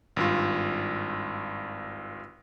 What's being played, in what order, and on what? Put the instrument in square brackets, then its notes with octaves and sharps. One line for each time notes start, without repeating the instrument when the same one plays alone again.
[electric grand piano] G#1 G2 F4